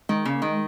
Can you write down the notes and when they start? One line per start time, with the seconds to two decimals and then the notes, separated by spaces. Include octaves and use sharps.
0.09 D#3 G#3
0.25 C#3 A#3
0.42 D#3 G#3